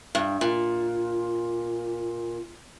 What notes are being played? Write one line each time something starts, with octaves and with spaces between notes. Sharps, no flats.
G2
A#2